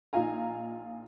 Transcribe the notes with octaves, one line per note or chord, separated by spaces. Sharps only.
A#1 D#4 F4 F5 G#5 A#5